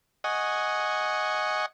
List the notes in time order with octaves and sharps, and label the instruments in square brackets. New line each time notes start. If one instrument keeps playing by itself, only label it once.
[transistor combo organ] D#5 F#5 G#5 C#6